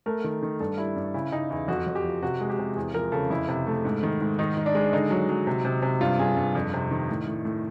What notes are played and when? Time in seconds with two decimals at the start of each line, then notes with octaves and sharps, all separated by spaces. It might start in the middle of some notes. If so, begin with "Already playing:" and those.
0.06 A3 A#4
0.24 D#3
0.43 D#3
0.60 G2 A4
0.78 G3 E4
0.96 G2
1.14 C#3 E4
1.32 C#3 D#4
1.50 E2 E4
1.68 F2 F#4
1.87 F2
1.95 G4
2.04 F3
2.23 C3 F#4
2.40 G#3
2.50 G4
2.59 C3
2.76 E2 G#4
2.94 F3 A#4
3.12 C#3 A4
3.30 F2 E4
3.48 C3
3.67 A3
3.85 G#2
4.03 D#3
4.21 G#2
4.39 D#3 D#4
4.57 D#3
4.66 D4
4.75 G#3
4.93 D3 D#4
5.11 F#3
5.29 F#3
5.47 C3
5.65 C3
5.82 C3
6.01 G2 F4
6.19 G2 G#4
6.37 G2
6.55 F2
6.73 C3
6.91 D#3
7.10 A2
7.27 A2
7.45 A2